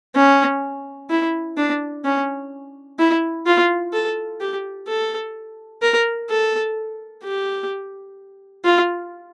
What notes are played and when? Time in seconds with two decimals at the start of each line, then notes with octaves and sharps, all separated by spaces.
0.15 C#4
1.10 E4
1.57 D4
2.04 C#4
2.99 E4
3.46 F4
3.93 A4
4.41 G4
4.88 A4
5.82 A#4
6.30 A4
7.23 G4
8.65 F4